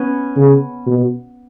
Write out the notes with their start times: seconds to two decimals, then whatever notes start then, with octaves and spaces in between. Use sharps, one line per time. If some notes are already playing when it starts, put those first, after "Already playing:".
Already playing: B3 C#4
0.36 C#3
0.87 B2